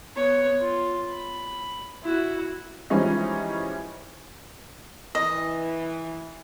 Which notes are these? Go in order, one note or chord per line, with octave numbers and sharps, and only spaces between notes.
B3 C#5
F4
B5
E4 F#4
E3 F3 G3 G#3 C#4 D#4
E3 D#5